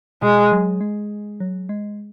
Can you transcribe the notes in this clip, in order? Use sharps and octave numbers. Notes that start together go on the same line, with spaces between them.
B2 G#3
F#3
G#3
F#3
G#3